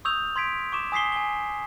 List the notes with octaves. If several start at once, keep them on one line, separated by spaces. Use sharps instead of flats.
C#6 D#6 E6 G6 F7
C6 G#6 B6 D7
C#6 D6 E7
G#5 D#6 B6 C7 G7
G#5 G7